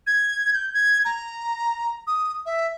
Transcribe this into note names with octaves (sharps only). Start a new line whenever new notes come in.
G#6
G6
G#6
A#5
D#6
E5